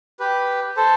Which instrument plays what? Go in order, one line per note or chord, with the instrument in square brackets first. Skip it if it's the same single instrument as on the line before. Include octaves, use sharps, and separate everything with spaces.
[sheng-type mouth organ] G4 B4
A4 C5